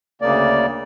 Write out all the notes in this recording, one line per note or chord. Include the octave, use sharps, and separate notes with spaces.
D2 C#3 A#3 D5